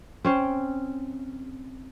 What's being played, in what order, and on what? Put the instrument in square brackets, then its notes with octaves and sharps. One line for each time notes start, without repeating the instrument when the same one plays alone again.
[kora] C4 C#4 C5